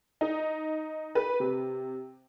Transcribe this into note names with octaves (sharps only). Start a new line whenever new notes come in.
D#4
B4
C3